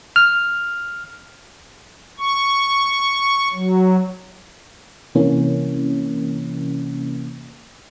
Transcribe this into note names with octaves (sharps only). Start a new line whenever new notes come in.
F6
C#6
F#3
C3 E3 A#3 C#4